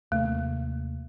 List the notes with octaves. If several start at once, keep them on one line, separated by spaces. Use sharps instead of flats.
D#2 C3 A3 A#3